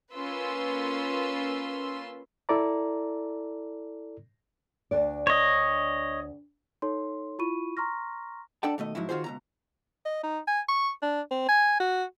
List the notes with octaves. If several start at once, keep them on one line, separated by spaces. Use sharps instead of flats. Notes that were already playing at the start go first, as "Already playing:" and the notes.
A#3 C#4 F4 B4 C6 E6
E4 A4 D5 A#5
D2 D4 D5
C#5 D#5
D#4 A4 C#5 C6
E4 F4 B5 C#6 D#7
A#5 C6 C#6 F6 A#6
D4 A4 D5 F#5 G5 A5
D#2 B2 A3 D#5
G#2 F3 F#3 E4
D#3 F4 F#4 G#4 C5
C#2 B2 A#5
D#5
D#4
G#5
C#6
D4
C4
G#5
F#4